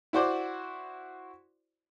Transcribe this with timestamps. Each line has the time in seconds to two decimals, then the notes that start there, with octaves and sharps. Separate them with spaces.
0.13 E4 F#4 C5 D5